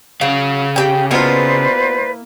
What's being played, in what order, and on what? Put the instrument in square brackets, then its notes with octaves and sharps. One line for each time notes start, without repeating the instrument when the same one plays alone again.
[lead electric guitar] C#3 F5 [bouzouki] F#3
[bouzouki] G4 G5
[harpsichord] B2 F4 [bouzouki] A#3 E4 [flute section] B4 C5 D5